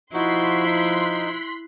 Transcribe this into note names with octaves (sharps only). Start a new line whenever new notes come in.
F3 D#4 E4 F#4 C6 F#6 B6
D#4